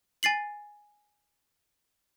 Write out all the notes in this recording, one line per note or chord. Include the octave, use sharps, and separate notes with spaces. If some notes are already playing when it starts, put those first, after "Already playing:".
G#5 A6 C7 F#7